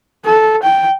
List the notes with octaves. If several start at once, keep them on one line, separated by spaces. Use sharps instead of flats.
A4
G5